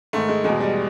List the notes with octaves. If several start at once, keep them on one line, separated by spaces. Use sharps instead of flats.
G#2 D#3 A3
G#3
E2 B2 G#3
G3